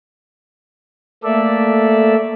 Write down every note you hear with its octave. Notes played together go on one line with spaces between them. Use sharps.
A3 A#3 A4 D5 E5